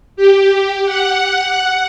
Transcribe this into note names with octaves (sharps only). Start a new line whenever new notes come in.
G4
F#5